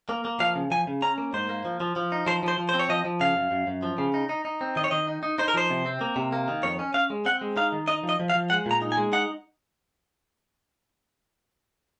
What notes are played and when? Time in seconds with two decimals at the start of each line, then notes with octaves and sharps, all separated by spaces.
0.09 A#3
0.25 A#3
0.40 F3 F5
0.55 C#3
0.71 F3 G#5
0.87 C#3
1.02 C#4 A#5
1.18 A#3
1.33 G#2 C5
1.49 A#3
1.65 F3
1.80 F3
1.96 F3
2.12 D#4
2.26 F3 C5
2.43 F3 C5
2.58 F3
2.69 C5
2.74 C4
2.79 C#5
2.89 F3 D#5
3.05 F3
3.20 C#3 F5
3.36 F#2
3.51 F#2
3.67 F#2
3.83 F3
3.98 C#3
4.14 D#4
4.29 D#4
4.45 D#4
4.61 C4
4.76 D#3 D#5
4.84 C#5
4.91 D#3 D#5
5.07 D#4
5.23 D#4
5.38 D#4 C5
5.48 A#4
5.54 F3 C5
5.70 C3
5.86 C4
6.01 A#3
6.16 C3
6.32 A#3
6.48 D#3
6.63 F2 C#5
6.79 C#4
6.94 C#4 F5
7.10 G#3
7.25 C4 F#5
7.41 G#3
7.57 D#4 F5
7.72 D#3
7.88 D#4 D#5
8.04 F3
8.09 D#5
8.20 F3
8.30 F5
8.35 F3
8.50 G#3 F#5
8.66 A#2 A#5
8.82 D#4
8.92 G#5
8.97 G#3
9.13 D#4 F#5